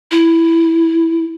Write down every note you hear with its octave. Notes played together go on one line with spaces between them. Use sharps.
E4